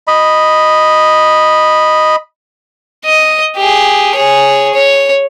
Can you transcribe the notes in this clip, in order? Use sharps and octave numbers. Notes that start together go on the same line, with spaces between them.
D#5 B5
D#5
G4 G#4
G#4 C#5
C#5